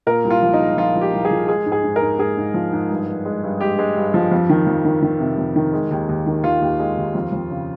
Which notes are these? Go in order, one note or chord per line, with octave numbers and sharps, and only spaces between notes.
A#2 A#4
C2
F4
F3
D#4
G#3
F3 F4
F3
G4
C2
G#4
F3
G#3 G#4
G#2
G#4
G#2
A#4
G#2
G#2 G#4
G#2
F3
G#2
G2
G2
G#3
G2
G#3 G4
G#3
G2
F3
F2
D#3
F2
D#3
D#3
C3
F2
D#3
G#3
D#2
D#2
D#3
D#2 F4
D#2
G#3
D#2
F2
F2
C#3